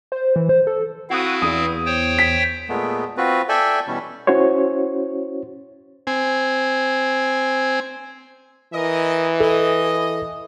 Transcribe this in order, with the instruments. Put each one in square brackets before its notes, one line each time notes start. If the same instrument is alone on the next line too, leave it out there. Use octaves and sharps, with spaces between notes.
[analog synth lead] C5
E3
C5
A4
[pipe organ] C4 E4 F5 [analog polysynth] F#4 D#6
[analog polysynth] E2 [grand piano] D#6
[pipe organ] C5 C#5 G5
[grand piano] B6
[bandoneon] A#2 G#3 A3 B3
C4 F4 F#4 B4
A4 D5 E5 G5 G#5
B2 E3 G3 C#4
[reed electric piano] C#4 E4 F#4 C5 C#5
[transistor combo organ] C4 G#5
[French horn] E3 [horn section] A#4 D#5
[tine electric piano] A4 [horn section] D#5